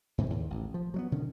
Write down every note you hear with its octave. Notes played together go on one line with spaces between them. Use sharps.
G#2 C3 E3 G3
D#2 A2 C#3
A1
F3
F#3 G#3 B3
B2 D3 D#3 C#4